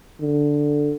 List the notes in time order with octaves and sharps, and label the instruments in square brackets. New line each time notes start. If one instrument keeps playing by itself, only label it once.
[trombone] D3